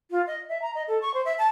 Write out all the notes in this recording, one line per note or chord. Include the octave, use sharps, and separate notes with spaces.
F4
D#5
E5
A#5
D#5
A4
C#6
C5
E5
A5